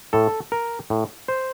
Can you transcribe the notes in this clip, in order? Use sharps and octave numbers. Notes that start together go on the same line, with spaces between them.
A2 A4
A#4
A2
C5